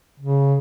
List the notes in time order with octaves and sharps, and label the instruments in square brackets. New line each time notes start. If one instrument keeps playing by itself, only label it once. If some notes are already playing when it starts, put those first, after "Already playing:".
[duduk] C#3